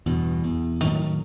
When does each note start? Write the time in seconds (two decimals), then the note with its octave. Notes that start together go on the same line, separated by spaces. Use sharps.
0.06 E2 G2 B2
0.44 E2
0.83 A2 D#3 F#3 C#4